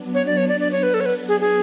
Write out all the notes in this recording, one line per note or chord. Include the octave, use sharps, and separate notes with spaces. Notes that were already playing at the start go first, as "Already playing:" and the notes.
Already playing: F#3 B3 D4
C#5
D5
C#5
D5
D5
C#5
B4
A4
C#5
B4
G#4
G#4